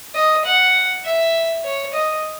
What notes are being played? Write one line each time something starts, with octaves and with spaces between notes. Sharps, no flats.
D#5
F#5
E5
C#5
D#5